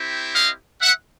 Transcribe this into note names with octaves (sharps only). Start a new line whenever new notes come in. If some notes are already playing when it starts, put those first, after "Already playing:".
Already playing: C4 E4 G4
D#5 F5
E5 F#5